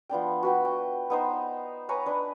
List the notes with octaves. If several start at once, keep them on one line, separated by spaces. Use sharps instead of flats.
F3 B3 D4 G5
F#4 B4 G5
G5
B3 D#4 C5
B4 C#5 G#5 A#5
D4 B4